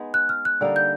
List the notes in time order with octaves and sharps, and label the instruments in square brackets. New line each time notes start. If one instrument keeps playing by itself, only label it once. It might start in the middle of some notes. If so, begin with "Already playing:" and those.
Already playing: [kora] G#3 B3 D#4 G#4
[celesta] F#6
F6
F#6
[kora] D3 G3 A#3 D#4
[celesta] G6